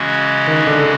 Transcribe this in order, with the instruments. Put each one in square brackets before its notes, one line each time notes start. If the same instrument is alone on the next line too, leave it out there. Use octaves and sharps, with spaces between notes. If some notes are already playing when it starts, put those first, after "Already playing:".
Already playing: [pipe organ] C#3 E3 G#3 C#4 F#4
[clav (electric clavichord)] D#3
D3